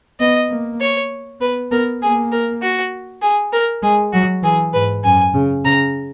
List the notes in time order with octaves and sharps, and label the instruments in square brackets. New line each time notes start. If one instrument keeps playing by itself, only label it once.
[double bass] B3 [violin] D#5
[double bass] A#3
[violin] C#5
[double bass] B3 [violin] B4
[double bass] B3 [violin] A#4
[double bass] A#3 [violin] G#4
[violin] A#4
F#4
G#4
A#4
[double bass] G#3 [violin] G#4
[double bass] F#3 [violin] F#4
[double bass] E3 [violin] G#4
[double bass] G#2 [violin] B4
[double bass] F#2 [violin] G#5
[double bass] C#3
[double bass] C#3 [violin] A#5